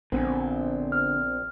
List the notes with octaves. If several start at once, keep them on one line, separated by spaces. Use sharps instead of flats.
A#1 D3 B3 C4 G#5
F6